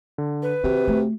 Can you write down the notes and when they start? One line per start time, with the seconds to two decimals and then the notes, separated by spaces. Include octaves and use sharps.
0.18 D3
0.42 B4
0.64 C3 D#3 F#4
0.88 A3